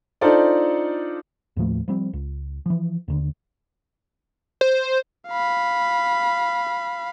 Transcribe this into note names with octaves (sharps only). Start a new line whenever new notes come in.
D4 D#4 F4 A4 C5 D5
D#2 A2 F3 A3
F3 G3 C4
C#2
E3 F3
D#2 D3
C5
F5 B5